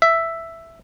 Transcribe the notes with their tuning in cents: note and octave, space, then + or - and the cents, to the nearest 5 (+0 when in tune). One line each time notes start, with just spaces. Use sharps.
E5 +5